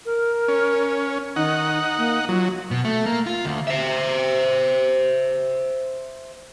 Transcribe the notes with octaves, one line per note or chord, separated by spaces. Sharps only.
A#4
C#4
D#3 D#4 F#5
A#3
F#3 F4
B2
A3
A#3
F4
D2
C5 E5